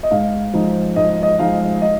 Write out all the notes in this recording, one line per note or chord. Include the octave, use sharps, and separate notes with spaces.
D#5
G#2 F5
F3 G#3 D#4
G#2 D#5
D#5
F3 G#3 D#4 F5
D#5